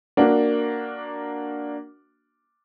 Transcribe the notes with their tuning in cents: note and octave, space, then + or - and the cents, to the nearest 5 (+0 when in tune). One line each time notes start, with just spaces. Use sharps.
A#3 +0 D4 +0 F#4 +0